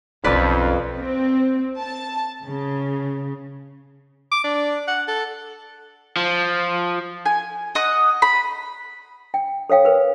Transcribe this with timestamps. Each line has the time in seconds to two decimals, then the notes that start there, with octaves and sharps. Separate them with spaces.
0.24 B1 F2 C#4 B4 D5 B5
0.98 C4
1.81 A5
2.43 C#3
4.32 D6
4.44 D4
4.88 F#5
5.08 A4
6.16 F3
7.26 G#5
7.75 D#5 F#5 D#6
8.22 B5
9.34 G5
9.70 A4 C#5 F5 G5
9.85 A#4 B4